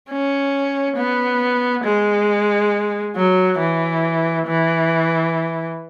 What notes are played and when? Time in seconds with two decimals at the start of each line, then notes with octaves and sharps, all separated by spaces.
0.09 C#4
0.96 B3
1.84 G#3
3.16 F#3
3.60 E3
4.47 E3